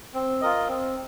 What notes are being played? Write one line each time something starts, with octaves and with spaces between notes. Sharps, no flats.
C4
F4 A#4 D#5
C4